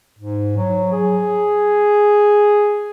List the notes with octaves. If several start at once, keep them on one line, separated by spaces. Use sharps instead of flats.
G#2
F#3
G#4